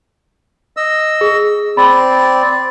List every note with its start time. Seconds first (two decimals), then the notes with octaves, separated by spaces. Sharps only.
0.77 D#5 E6
1.21 G#4
1.77 C4 D5 B5